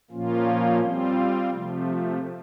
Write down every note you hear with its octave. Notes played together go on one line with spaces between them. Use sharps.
A#2 F3 A#3 C#4 F4
G3 C4 F4
C3 F3 A3